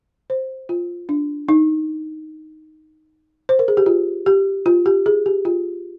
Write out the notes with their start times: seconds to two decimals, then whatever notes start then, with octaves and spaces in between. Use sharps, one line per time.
0.30 C5
0.69 F4
1.09 D4
1.49 D#4
3.49 C5
3.59 A#4
3.68 G#4
3.77 G4
3.86 F4
4.26 G4
4.66 F4
4.86 G4
5.06 G#4
5.26 G4
5.45 F4